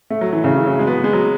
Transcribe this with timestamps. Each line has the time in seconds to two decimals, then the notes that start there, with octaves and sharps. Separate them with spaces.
0.10 A3
0.21 F#3
0.33 E3
0.44 C#3
0.56 E3
0.67 F#3
0.79 G#3
0.87 B3
1.04 G#3
1.13 F#3